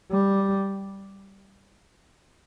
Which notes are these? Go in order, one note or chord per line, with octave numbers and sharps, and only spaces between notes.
G3